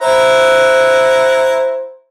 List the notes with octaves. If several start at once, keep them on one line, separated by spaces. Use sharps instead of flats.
E4 C5 F#5 A#5